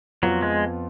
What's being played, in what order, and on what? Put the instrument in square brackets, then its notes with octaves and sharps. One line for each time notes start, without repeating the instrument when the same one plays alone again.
[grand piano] F2 F3 B3 F4 [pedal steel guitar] F#3
[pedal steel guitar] G#3